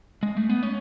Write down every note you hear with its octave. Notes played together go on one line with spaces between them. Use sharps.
G#3
A3
B3
C#4